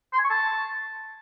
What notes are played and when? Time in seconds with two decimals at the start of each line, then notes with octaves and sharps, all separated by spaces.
0.13 C6
0.19 G#5
0.24 C#6
0.30 A5